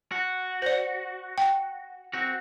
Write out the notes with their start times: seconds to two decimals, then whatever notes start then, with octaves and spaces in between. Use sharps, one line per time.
0.12 F#4
0.62 C5 D5
1.38 G5
2.13 C4 F#4